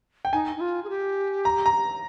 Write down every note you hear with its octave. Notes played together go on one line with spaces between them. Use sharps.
G5
D#4 G#5
D#4
F4
G#4
G4
A#5
A#5